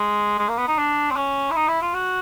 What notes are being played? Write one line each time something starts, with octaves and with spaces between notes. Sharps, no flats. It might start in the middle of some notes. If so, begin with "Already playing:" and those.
Already playing: G#3
G#3
A#3
B3
D#4
D4
C4
C#4
E4
D#4
E4
F4
F#4